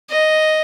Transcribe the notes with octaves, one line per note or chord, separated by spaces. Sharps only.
D#5